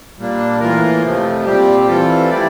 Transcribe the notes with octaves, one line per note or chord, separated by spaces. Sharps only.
A#2 G3 A#3 D4
A2 E3 A#3 F4 A#4
F2 C3 F3 A3
A#2 G3 C4 G4
E3 G3 C4 F4 A4
E3 A3 E4 G4 D5